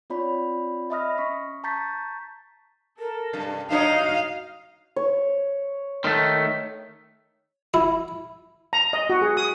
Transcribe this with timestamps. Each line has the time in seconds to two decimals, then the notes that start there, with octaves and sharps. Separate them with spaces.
0.10 C4 F4 C#5 D5 B5
0.90 D#5 E5 B5 D#6 F6 A#6
1.18 C#4 C#6 B6
1.64 A5 A#5 C#6 G6 A6 B6
2.99 A4 A#4
3.33 G2 C3
3.70 D4 D#4 F#4 B4 C#5 D#5 F5
4.96 C#5
6.05 D#3 A3
7.74 E4
8.73 A#5
8.93 D#5
9.10 F#4
9.22 G#4
9.37 D#6